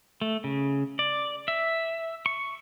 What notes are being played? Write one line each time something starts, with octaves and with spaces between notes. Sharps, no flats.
A3
C#3
D5
E5
C#6